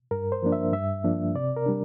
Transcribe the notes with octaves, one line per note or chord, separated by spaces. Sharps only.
G2 A#4
C5
F3 A#3 D4
E5
G2 E5
F3 A#3 D4
C3 D5
A#4
G3 D4